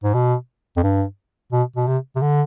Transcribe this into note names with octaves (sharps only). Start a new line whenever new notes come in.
G#2
B2
F2
G2
B2
B2
C3
C3
D3